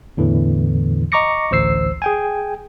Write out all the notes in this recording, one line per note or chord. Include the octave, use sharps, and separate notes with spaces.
E2 A2 D3 E3
D#5 A#5 C#6 D6 A#6 C#7
A1 D2 C5 E6 C7
G#4 G5 G#5